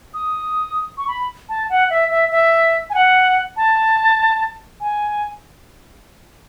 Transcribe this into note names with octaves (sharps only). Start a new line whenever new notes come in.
D#6
C#6
B5
A5
F#5
E5
E5
E5
G#5
F#5
A5
G#5